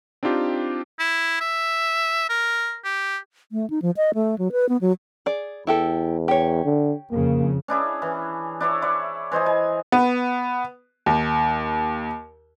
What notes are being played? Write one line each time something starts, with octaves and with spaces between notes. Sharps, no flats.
C4 D4 D#4 F4 G4
E4
E5
A#4
G4
A3
D#4
F3
D#5
A3
F#3
B4
B3
F#3
G#4 D5
E2 E4 G4 A4
G4 C#5
D3
F2 C#3 A#3
C#4 D4 E4 G#4
E3
D4 E4 C#5 E5
E4 C#5 D5
E3 C5 D#5 G#5
G#5
B3
D#2